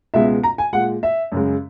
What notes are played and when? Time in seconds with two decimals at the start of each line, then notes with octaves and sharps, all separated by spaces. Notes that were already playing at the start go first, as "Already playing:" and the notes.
0.14 C#2 B2 G#3 E5
0.43 A#5
0.58 G#5
0.73 A#2 G#3 F#5
1.03 E5
1.32 F#2 C#3 G#3